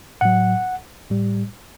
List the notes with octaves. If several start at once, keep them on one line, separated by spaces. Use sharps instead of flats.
A2 F#3 F#5
A2 G3